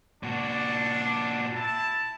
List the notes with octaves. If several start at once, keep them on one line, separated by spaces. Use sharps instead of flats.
A#2 D4 F#4
E4 A5